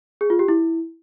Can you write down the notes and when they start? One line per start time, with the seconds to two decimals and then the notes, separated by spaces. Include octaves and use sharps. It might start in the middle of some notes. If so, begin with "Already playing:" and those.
0.21 G#4
0.30 F4
0.39 G4
0.48 E4